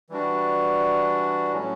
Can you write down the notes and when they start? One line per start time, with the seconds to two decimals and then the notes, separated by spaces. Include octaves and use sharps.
0.10 E3 G3 D4 F#4
1.52 A2 F#3 C#4